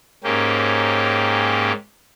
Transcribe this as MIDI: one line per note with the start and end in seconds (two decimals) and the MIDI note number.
0.24 1.72 44
0.24 1.72 58
0.24 1.72 61
0.24 1.72 67